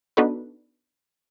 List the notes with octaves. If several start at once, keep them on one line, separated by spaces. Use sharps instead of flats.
B3 D4 D#4 F#4 A4 B4